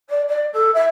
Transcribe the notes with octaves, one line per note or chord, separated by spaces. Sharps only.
D5
D5
A4
E5